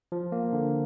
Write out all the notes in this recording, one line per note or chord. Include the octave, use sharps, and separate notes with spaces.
F3
A#3
D3